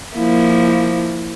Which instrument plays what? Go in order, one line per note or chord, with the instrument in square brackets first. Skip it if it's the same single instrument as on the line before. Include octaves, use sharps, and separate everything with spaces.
[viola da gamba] F3 A#3 E4